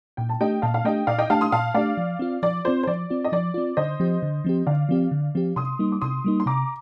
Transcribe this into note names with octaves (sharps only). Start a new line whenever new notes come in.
A#2 G5
A5
A3 D4 G4 D#5 G5
A#2 F5 A5
F5
A3 D4 G4 D#5 G5
A#2 D5 F5
D#5 G5
A3 D4 G4 F5 A5
C6 D#6
A#2 F5 A5
A3 D4 G4 D5 F5
F3
C4 F4
F3 D5
C4 F4 C5
C5
F3 D5
C4 F4
D#5
F3 D5
C4 F4
D3 C5 D#5
F3 C4 G4
D3
F3 C4 G4
D3 D5 F5
F3 C4 G4
D3
F3 C4 G4
C3 C6 D#6
G3 A#3 D#4
D6
C3 C6 D#6
G3 A#3 D#4
C6
C3 A#5 D6